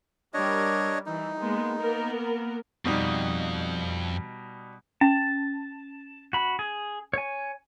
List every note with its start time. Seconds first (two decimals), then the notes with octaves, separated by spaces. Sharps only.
0.34 G3 D4 A#4 C#5 D#5
1.06 E3 D#4
1.39 G#3 A#3 B3
1.77 A#3 B3 A#4
2.85 F2 B2 G3 D#4
5.01 C#4 A5
6.33 F#4 B5
6.59 G#4
7.13 C#5 G#5